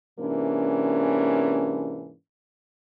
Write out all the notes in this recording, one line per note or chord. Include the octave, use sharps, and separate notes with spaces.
G#2 C3 E3 A#3 C#4 D4